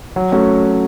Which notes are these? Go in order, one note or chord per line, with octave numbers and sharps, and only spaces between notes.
F#3
A3 C#4 F#4